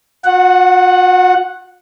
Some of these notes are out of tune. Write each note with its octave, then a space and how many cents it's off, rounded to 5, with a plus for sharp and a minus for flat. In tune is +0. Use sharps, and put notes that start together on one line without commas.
F#4 -45 F#5 +0